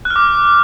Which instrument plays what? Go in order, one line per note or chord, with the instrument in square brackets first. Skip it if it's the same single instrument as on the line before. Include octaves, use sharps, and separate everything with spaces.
[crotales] F#6
F6
D6